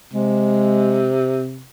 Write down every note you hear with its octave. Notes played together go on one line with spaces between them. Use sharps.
C3 G#3